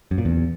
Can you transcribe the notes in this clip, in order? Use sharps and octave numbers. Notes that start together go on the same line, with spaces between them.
F#2
A#2
E2